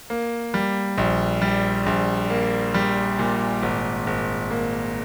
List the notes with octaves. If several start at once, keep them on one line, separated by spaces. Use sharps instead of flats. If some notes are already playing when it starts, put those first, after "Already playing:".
A#3
G3
A#1
G3
A#1
A#3
G3
A#2
G#1
G#1
A#3